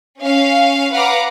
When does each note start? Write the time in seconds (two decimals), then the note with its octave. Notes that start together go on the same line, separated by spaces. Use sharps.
0.21 C#4 F5
0.93 B4 F5 F#5 A#5 D6